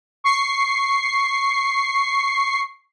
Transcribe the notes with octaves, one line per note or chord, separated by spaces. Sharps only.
C#6 C7